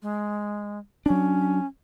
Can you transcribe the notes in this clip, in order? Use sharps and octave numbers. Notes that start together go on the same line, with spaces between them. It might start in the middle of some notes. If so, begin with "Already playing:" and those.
G#3
F#3 C#4 D4